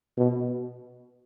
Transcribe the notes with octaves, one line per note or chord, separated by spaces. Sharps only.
B2